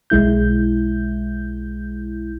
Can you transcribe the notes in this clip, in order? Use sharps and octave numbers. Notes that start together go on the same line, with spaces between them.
B1 G#3 E4 G6